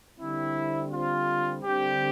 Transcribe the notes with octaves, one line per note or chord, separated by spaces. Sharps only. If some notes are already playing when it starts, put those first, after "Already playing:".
D3 G3 C4 E4
F4
D3 G3 C4 G4